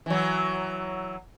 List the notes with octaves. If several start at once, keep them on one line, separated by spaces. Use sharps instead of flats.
E3 F#3